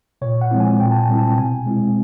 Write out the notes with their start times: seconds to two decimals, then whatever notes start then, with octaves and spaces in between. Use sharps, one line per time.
0.22 A#2 C#5
0.41 F#5
0.51 F3 G#3 C4 E4
0.60 G#5
0.80 A#2 G5
0.91 A5
0.99 G#5
1.08 G3 C4 E4
1.18 A5
1.31 G5
1.38 B2 G#5
1.66 G#3 C4 E4